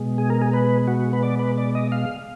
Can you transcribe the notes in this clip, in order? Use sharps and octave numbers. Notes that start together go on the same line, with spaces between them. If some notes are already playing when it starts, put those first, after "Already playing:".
Already playing: B2 G#3
G#4
A#4
G#4
B4
F#4
B4
D5
B4
D5
D#5
F5